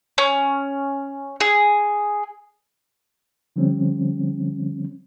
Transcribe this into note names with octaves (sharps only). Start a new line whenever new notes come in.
C#4
G#4
D3 F3 G3 C4 C#4